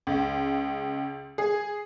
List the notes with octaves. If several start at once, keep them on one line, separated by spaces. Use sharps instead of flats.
C#2
G#4